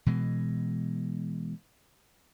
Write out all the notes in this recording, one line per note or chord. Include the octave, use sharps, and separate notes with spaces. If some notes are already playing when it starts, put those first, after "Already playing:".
B2 E3 G#3